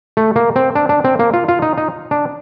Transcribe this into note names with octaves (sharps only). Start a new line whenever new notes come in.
A3
A#3
C4
D4
D4
C4
A#3
F4
F4
D#4
D#4
D4